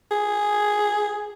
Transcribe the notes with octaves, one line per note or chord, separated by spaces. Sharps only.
G#4